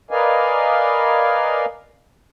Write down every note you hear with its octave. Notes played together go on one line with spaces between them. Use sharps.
A#4 B4 D5 D#5 F5 G#5